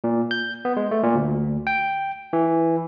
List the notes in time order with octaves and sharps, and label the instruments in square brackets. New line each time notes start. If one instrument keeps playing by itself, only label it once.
[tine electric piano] A#2
G6
B3
G#3
A3
A#2
D2
G5
E3